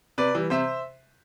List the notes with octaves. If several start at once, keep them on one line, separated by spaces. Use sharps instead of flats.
C3 B4 D5
E3 G3
C3 C5 E5